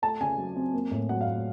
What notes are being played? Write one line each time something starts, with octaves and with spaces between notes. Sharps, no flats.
A3 A5
C#3 G#5
F#3
C4
A#3
A2
F#3 F#5
F5
A2